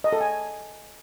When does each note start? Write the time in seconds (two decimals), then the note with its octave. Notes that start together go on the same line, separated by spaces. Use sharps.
0.04 D#5
0.13 A4
0.21 G#5